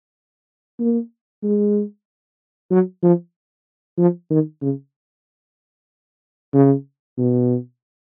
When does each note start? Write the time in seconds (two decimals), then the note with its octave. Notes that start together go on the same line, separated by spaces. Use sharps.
0.80 A#3
1.43 G#3
2.71 F#3
3.03 F3
3.98 F3
4.30 D#3
4.62 C#3
6.54 C#3
7.17 B2